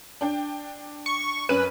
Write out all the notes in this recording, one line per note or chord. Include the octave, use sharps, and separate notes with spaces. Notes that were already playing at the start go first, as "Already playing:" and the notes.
D4 G5
C#6
F#2 C#4 B4 D#7